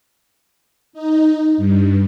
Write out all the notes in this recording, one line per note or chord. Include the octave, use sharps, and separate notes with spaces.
D#4
G2